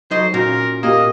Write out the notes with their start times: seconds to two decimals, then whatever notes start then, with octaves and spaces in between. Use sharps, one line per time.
0.11 F#3 D#4 A4 C5 D#5
0.34 A#2 C#4 F#4 A#4
0.83 A#3 G4 D#5 F5